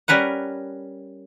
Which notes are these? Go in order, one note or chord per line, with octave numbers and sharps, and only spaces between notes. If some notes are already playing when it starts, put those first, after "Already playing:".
G3 C#4 A#4 B4 F#5